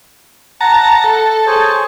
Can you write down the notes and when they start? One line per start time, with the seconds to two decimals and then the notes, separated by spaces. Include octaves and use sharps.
0.61 F#5 A5 A#5
1.04 A4
1.47 G#4 C5 C#5